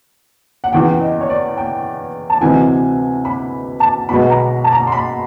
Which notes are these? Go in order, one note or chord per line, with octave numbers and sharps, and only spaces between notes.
F#5
E2 C#3 E3 G5
D#5
C#5
D5
G5
A5
D2 C3 E3 G#3 C4 G#5
B5
A5
B1 B2 G#3 B3 B5
A#5
A5
A#5
C6
B5